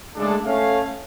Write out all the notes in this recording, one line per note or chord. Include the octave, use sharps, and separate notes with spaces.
C#3 G#3 A3 D4 G#4 A4
A3 C#4 F5